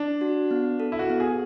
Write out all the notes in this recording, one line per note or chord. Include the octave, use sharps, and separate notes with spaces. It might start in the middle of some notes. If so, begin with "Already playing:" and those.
Already playing: D4
F#4
B3
A4
E4
F#4
B3
G#4